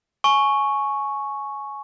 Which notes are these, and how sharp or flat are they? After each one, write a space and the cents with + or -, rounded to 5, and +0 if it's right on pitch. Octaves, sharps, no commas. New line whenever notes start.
G#5 +20 C#6 -5